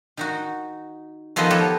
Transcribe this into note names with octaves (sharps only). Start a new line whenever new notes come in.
D#3 D#4 F#4
D#3 F3 B3 A4 C5 D#5
G4 A4 B4 C#5 E5